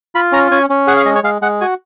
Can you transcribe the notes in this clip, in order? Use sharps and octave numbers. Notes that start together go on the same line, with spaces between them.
F4 B5
C#4 A#5
C#4 G#5
C#4
G#4 F#5
F5
G#3 D#5
C#5
G#3 F5
G#3 F#5
F#4 G#5